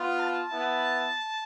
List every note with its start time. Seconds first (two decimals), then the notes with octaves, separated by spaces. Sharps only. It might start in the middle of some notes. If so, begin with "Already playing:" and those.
Already playing: B3 F4
0.19 A5
0.52 B3 E4